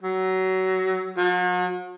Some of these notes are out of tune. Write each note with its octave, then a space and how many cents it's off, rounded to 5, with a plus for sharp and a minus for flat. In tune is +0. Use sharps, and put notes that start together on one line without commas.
F#3 +20
F#3 -45